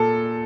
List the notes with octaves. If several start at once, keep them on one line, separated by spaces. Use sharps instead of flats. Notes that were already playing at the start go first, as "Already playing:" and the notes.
Already playing: A#2 A4